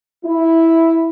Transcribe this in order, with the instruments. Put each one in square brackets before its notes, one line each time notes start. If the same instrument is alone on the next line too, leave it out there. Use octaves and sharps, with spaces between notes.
[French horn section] E4